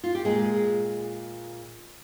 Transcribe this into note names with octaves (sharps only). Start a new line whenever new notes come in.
F4
G4
A#2 G#3 G#4